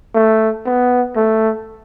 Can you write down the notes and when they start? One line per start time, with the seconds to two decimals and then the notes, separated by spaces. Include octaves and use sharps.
0.15 A3
0.66 B3
1.16 A3